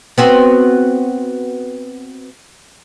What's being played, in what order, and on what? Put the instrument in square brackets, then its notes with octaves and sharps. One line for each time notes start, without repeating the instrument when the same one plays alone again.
[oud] B3 C4 F#4